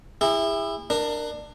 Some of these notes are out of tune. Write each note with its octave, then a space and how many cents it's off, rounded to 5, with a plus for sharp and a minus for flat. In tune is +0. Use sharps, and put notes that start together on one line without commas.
E4 +0 G#4 -45
D4 +25 A#4 +0